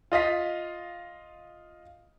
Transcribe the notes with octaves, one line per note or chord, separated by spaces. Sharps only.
F4 D#5 F5 B6